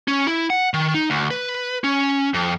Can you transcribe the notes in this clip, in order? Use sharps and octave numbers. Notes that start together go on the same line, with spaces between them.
C#4
E4
F#5
D#3
D#4
D2
B4
C#4
F2